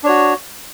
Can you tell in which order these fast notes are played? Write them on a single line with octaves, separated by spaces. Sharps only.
D4 C#5 F#4